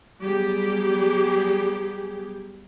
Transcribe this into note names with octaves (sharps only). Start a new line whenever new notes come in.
F#3 G3 B3 G4 G#4